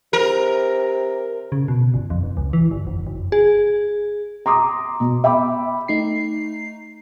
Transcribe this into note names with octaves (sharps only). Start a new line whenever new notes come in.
C3 A#4
C#3
B2
G1
F2
E1
C#2
E3
G1
F1
F#1
G#4
A#5 C6 D6 D#6
B2
E5 G5 B5 D6
A3 D#4 C7